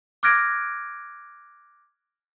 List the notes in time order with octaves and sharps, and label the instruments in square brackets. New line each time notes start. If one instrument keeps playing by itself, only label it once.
[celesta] D6 F6 F#6 G#6 A#6 D7